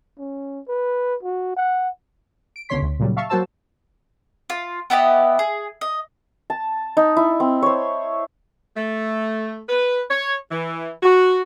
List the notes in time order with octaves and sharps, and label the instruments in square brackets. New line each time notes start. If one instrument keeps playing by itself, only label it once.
[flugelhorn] C#4
B4
F#4
F#5
[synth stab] D7
C#2 B2 D3 C#5 C6 B6
D2
A#2 C#3 F#3 G3
E5 F5 A5 C#6
F#3 A#3 F#4 C5 A5 E6
[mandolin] F4
B3 E4 G4 D#5
G#4
D#5
[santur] A5
D#4
E4
C4
C5 C#5
[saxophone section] A3
B4
C#5
E3
F#4